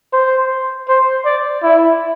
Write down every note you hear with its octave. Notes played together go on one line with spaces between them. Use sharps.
C5
C5
D5
E4